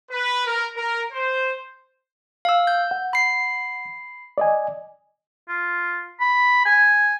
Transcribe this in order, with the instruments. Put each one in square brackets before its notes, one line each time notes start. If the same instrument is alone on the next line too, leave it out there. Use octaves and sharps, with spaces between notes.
[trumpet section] B4
A#4
A#4
C5
[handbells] F5 E6
G6
[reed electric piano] F#5
[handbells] B5 C7
[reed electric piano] D5 D#5 G#5
[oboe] F4
B5
G#5